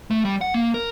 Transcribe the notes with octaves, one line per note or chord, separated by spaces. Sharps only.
A3
G3
F#5
A#3
A#4